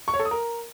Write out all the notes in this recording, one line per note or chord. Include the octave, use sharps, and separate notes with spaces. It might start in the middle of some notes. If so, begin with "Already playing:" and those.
C#6
C#5
A4
D#6
A#4